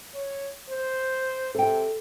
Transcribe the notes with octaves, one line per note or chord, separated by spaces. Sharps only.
C#5
C5
C3 A4 G5